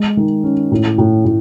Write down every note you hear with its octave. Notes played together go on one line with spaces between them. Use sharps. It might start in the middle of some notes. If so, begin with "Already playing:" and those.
Already playing: G#3
D#3
C#4
A2
A2
A2